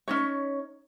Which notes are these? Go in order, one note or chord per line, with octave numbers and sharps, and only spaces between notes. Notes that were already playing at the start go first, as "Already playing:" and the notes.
C#4 D#4 C#5